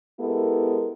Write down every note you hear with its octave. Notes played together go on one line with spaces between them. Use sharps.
G#3 B3 E4 G4 A4 A#4